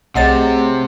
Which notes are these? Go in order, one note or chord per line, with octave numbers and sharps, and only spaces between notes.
B1 C3 A3 G#4 C#5 D#5 F#5 A6